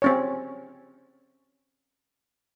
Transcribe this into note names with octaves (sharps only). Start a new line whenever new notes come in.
C4 C#4 C#5